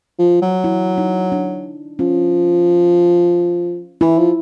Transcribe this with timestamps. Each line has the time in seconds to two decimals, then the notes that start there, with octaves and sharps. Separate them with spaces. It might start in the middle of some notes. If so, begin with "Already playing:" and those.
0.19 F3
0.42 F#3
0.64 E4
0.98 D#4
1.32 D4
1.99 F3 C#4
4.01 E3 E4
4.19 F3